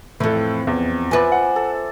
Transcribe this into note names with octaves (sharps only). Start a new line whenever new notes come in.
F2 A2 E3 A4
E2
F3 B4 D5 E5 G#5
F#5
A4